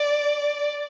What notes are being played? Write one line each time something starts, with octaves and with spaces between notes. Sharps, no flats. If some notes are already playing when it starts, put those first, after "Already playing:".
Already playing: D5